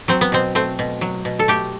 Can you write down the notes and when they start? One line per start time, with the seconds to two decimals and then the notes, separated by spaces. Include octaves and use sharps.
0.08 F#3 C4
0.21 B3
0.32 B2 C4
0.55 A3 C4
0.79 B2
1.01 F#3
1.25 B2
1.39 A4
1.48 A3 G4